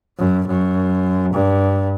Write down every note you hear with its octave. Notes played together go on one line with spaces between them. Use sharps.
F#2
F#2
G2